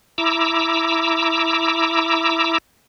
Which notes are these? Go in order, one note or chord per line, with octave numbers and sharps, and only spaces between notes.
E4 A#5 D6 E6